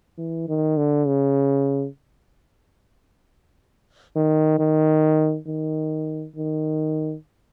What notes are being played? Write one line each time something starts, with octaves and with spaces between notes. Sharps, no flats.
E3
D#3
D3
C#3
D#3
D#3
D#3
D#3